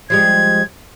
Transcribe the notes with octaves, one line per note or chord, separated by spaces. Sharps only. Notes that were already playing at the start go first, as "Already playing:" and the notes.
F3 G3 G#3 G#6